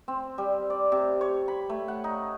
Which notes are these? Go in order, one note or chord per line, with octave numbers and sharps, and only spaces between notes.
C4
G3
D5
C3
C#5
B5
A3
F#5
D#4